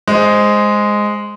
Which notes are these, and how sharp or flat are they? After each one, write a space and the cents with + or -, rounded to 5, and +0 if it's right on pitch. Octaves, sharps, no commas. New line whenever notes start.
G#3 +0 C5 +0